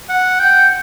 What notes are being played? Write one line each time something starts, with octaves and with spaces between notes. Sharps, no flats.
F#5
G5